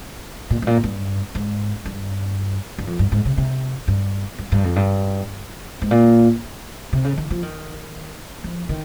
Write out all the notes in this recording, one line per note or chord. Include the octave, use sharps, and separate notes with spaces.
A#2
G#2
A#2
G2
G#2
G2
G2
F2
G2
G#2
C3
C3
G2
G2
G2
F2
G2
G#2
A#2
C3
C#3
D#3
F3
D#3
F3
D#3